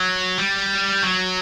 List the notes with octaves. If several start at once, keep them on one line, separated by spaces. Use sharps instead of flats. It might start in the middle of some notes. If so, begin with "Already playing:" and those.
Already playing: F#3
G3
F#3